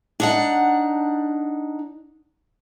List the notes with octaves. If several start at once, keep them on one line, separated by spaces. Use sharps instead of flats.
D4 D#4 F#5